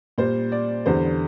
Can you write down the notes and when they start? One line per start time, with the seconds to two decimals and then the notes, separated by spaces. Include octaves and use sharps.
0.18 A#2 G3 C5
0.52 D5
0.86 E2 D3 G3 C5